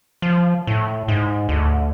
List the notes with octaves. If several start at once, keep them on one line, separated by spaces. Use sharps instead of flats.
F3
A2
G#2
D2